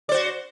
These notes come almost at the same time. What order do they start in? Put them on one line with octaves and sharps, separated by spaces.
D5 C5 F#4